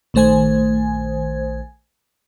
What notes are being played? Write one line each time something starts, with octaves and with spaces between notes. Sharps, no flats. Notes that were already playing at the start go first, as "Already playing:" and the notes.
A#1 D#3 A3 C5 G#5 G#6